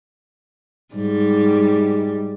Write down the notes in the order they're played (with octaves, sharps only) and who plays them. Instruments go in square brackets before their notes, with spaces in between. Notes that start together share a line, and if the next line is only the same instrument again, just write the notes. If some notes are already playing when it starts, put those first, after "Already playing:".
[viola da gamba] G#2 G3